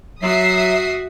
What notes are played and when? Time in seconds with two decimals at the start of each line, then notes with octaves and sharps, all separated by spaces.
0.22 F#3 F#4 E5 D#6 C7